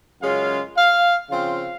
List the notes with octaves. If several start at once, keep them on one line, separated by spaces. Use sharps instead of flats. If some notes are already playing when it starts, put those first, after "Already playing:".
F#2 C#3 G#3 C#4 F4 F5
F5
C#3 F3 C4 F4 F5